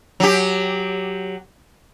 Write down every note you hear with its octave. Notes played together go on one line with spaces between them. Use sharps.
F#3 G4